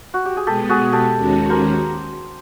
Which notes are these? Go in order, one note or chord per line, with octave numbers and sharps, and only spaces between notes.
F#4
G4
G#4
B2 G#3 B3 G4 A4
F#4 G#4
G4 A4
D#2 D#3 G#3 C#4 F#4
A#4 C5